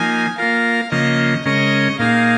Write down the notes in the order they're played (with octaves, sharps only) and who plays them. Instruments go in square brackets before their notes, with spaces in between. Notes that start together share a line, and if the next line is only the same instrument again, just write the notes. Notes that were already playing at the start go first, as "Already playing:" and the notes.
Already playing: [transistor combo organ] F3 A#3 D#4 [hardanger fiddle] G#5
[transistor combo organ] A#3 F4 A#4 [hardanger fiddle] F5
[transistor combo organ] C#3 F3 A#3 [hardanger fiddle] D#5
[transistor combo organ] C#3 G#3 C#4 A#4 [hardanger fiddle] D#5
[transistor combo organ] A#2 A#3 D#4 G#4 [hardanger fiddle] F5